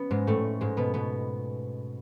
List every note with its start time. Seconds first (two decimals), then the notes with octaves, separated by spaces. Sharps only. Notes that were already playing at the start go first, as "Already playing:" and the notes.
Already playing: B3 C#4
0.11 G#2 G#3
0.27 A2 A3
0.61 G#2 G#3
0.77 B2 B3
0.94 B2 B3